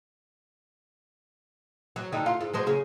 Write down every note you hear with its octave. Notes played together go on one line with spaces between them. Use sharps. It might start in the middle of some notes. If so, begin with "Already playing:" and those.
F#3
D3 G3 D#4
F4
G#2
F#3 G#3 C5
C#3 G#4